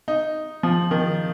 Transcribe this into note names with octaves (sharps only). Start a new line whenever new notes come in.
D#4
F3
D#3